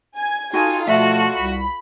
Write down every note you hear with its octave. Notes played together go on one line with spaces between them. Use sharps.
G#5 G#6
D#4 F4 F#4 A4 G5 G#5
B2 F3 A3 F#4 D5 E5 A5
C2 B5